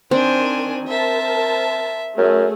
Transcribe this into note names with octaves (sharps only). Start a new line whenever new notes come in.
D#3 C4 D4 C5 G#5
A#4 C5 E5 A5
F#2 A3 G#4